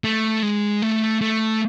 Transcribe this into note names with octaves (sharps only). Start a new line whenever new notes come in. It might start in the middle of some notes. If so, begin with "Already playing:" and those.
A3
G#3
A3
A3